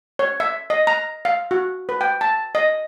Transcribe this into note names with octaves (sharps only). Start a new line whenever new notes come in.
C#5
E5
D#5
A#5
F5
F#4
B4
G5
A5
D#5